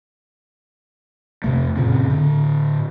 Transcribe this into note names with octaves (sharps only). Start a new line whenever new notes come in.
F2 C3 A3
F#2 A#2 C#3 C4
A2 D3